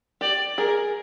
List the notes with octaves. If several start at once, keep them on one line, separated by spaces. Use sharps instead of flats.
G4 D5
G#4 A#4